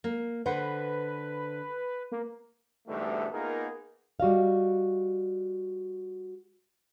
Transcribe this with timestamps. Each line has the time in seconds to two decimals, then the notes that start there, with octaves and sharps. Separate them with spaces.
0.04 A#3
0.46 D3 B4 C5 F#5
2.12 A#3
2.87 G#2 B2 D3 E3 G3 A3
3.32 A#3 B3 D#4 F4 G#4 A#4
4.20 G3 F#4 D#5 F5